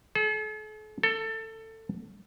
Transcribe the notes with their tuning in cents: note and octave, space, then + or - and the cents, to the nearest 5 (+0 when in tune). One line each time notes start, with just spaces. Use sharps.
A4 -45
A4 +20